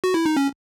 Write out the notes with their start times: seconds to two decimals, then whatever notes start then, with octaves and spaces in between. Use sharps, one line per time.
0.04 F#4
0.14 E4
0.26 D#4
0.37 C#4